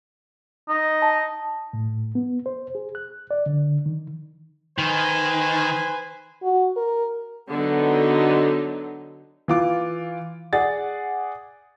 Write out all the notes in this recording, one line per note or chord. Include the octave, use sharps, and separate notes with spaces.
D#4
A5
A2
B3
C5
G#4
F#6
D5
D3
D#3
D#3 B4 C5 G#5
F#4
A#4
D3 F#3 B3 D#4
E3 F4 D6
G#4 D5 F#5 A6